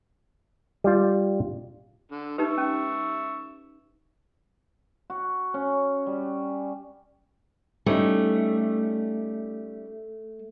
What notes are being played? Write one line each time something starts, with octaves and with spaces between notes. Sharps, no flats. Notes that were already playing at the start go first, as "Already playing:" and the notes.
G3 F4
D3
D#4 G4 B4 E5 C#6
C#4
F#4
C#4
G3
G3 A3 C#4 D#4